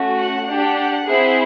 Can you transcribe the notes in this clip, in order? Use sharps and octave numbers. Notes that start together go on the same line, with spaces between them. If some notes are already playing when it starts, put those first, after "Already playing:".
Already playing: A3 C#4 F#4
F#5
D4 G4 F#5
C4 E4 G#4